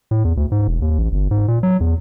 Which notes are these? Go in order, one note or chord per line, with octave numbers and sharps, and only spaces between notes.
A2
E2
D2
G#2
E1
D#2
A1
G1
G#2
A#2
F#3
E2